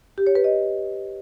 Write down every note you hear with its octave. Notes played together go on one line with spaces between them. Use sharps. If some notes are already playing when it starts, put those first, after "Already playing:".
G4
C#5
B4
D#5